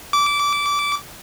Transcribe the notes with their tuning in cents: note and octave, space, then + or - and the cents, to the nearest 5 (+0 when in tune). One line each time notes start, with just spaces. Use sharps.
D6 -20